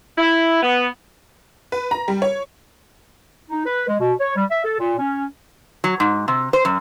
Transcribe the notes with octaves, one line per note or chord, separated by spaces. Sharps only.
E4
B3
B4
A#5
G3
C#5
D#4
B4
G#3
B2
C#5
G3
E5
A4
A#2
C#4
F#3
G#2
C3
C5
F#2